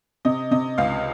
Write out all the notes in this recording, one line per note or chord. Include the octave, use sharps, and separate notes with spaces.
C3 D#5
C3 D#5
C#2 F5